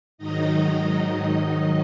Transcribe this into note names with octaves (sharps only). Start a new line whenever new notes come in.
G#2 D#3 F#3 D#4 D#5